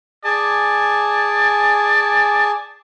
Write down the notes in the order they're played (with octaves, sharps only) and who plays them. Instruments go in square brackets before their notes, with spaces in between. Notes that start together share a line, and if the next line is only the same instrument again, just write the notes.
[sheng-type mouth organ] G#4 G#5 A5 [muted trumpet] D5